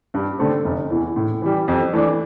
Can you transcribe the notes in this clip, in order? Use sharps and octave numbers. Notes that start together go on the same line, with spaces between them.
G2
D3 A3 C4
F1
E2 E3
A2
E3 G3
F2
E3 A3 D4